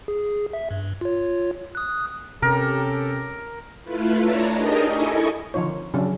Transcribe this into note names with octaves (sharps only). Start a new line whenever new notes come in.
G#4
E5
G2
F4 C#5
D#6 F#6
C3 C#4 G4 A4 A#4
A3 E4 F4 B4
D4 C#5 A5 A#5
D4 D#4 G4 G#4 A#4 D#5
E4 A4 D#5 G#5 C#6
D3 D#3 F3 D#4 F4 C#5
C#3 F#3 C#4 D4